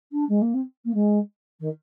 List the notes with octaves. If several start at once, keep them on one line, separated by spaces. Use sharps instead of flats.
D4
G#3
A#3
C4
A#3
G#3
D#3